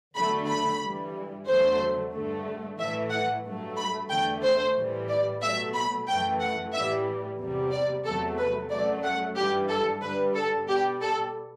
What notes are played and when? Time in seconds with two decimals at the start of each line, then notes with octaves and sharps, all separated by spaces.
0.15 E2 D3 F#3 A3 B5
0.48 B5
0.81 G2 E3 G3
1.47 E2 D3 F#3 A3 C5
2.12 G2 D3 A3
2.78 A2 E3 A3 E5
3.11 F#5
3.44 G2 F#3 A3
3.77 B5
4.10 E2 D3 A3 G5
4.43 C5
4.75 A2 E3 G3
5.09 D5
5.41 B2 F#3 A3 E5
5.74 B5
6.08 F#2 E3 A3 G5
6.41 F#5
6.73 A2 E3 G3 E5
7.39 E2 C3 G3
7.72 D5
8.05 E2 C3 F#3 A3 A4
8.38 B4
8.70 F#2 F#3 A3 D5
9.03 F#5
9.36 G2 E3 G3 G4
9.69 A4
10.02 G2 D3 G3 B4
10.35 A4
10.68 B2 G3 G4
11.01 A4